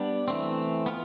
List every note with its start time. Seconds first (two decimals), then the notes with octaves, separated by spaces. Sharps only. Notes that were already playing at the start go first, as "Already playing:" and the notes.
Already playing: G3 B3 D4
0.28 E3 A3 C4
0.86 B3 F4